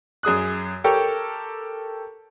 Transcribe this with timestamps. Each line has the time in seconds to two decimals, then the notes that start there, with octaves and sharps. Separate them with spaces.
0.23 F#2 G#4 D#6 F#6
0.84 G4 A4 A#4 C#5 G5